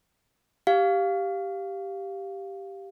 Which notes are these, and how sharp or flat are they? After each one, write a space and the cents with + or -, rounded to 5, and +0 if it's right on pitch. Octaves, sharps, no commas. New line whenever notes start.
G4 +0 F5 +0